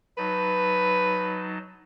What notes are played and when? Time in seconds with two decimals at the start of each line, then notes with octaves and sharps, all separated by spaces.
0.18 F#3 D#4 B4 A5